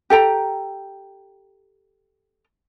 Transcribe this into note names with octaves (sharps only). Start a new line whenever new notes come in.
G4 A4 G5 A#5